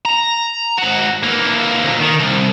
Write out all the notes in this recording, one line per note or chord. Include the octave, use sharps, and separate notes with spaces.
A#5
G#2 F#4
E3 A#3
D2 A#2
D#3
C2